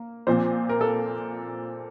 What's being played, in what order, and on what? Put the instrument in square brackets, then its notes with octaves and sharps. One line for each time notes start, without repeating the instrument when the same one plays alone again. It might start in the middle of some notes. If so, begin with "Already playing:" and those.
Already playing: [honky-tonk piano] A#3
[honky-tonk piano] A#2 F3 C4 [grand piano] C5
[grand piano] A#4
A4